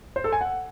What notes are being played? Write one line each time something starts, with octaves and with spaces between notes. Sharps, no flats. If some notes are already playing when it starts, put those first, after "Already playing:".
C5
A4
G#5
F#5